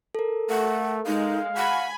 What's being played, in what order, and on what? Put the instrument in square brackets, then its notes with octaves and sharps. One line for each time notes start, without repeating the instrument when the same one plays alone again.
[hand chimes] A4 A#4
[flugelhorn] A3 [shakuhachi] F#5
[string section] G#3 [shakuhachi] D#4 [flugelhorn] F5
[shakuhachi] F#5 [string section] G#5 B5 G#6